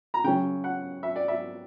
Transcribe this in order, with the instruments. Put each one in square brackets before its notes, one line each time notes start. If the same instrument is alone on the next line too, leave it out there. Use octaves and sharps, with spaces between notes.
[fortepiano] A#5
C#3 F#3 C#4 G5
F#5
E5
D5
E5